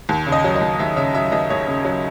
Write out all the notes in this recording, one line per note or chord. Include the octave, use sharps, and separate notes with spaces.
D#2
C#3
D#5
F#3
D#5
D#2
D#2 E5
C#3 E5
F#3 E5
D#2 D#5
D#2 C#5
C#3
F#3